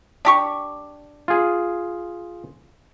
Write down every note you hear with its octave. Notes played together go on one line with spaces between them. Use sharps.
D4 G4 C#6
F4 G#4